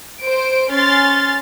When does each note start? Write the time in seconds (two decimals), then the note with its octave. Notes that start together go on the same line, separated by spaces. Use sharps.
0.22 C5 D7
0.71 C#4 C6 F6 A6